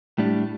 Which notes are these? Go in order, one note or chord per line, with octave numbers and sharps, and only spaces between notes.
A2 G3 D4